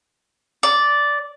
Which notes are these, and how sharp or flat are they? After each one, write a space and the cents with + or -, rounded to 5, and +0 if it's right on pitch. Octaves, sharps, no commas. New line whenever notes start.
D5 -10